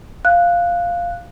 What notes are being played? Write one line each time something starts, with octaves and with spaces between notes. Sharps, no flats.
F5 F#6